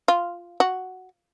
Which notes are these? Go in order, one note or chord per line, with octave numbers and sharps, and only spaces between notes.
F4
F#4